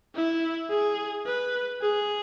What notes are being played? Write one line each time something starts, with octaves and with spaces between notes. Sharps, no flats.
E4
G#4
B4
G#4